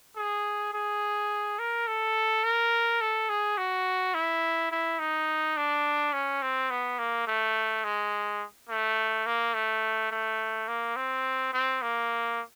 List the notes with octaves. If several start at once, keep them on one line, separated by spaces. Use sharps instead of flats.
G#4
G#4
A#4
A4
A#4
A4
G#4
F#4
E4
E4
D#4
D4
C#4
C4
B3
A#3
A3
G#3
A3
A#3
A3
A3
A#3
C4
C4
A#3